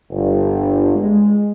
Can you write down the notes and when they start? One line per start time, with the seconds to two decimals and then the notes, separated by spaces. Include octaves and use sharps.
0.10 G1
0.94 G#3